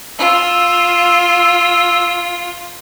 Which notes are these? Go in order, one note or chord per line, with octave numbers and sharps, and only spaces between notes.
F4 E6